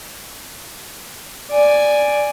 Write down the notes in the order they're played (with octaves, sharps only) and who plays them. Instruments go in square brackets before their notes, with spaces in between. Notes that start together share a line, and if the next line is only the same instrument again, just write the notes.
[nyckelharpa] D5 G#5